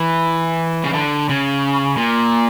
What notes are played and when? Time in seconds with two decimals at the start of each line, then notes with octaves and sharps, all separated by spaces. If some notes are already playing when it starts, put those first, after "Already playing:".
Already playing: E3
0.84 C#3
0.94 D3
1.29 C#3
1.97 A#2